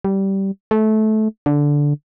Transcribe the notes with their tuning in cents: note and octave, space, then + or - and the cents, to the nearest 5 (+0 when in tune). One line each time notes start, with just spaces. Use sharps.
G3 -15
A3 -20
D3 -10